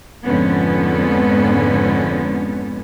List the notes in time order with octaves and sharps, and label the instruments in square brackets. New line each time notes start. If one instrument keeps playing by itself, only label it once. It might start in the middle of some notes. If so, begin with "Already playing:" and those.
[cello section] F2 G#2 D3 G#3 B3 C#4